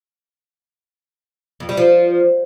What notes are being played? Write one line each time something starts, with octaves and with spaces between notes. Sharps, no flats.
F2
G3
F3